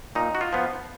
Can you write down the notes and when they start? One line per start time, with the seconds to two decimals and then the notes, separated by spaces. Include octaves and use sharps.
0.15 A#2 D#4
0.35 F#4
0.41 F4
0.53 F3 B3